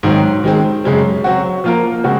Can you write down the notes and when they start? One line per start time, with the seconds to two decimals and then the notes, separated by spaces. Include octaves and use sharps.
0.03 G#2 D#3 F#3 C4
0.44 D#3 G#3 C4
0.84 F#2 C#3 G#3 C4
1.24 F#3 C4 F#4
1.64 F3 A#3 F4 A#4
2.04 C#3 G#3 C4 F#4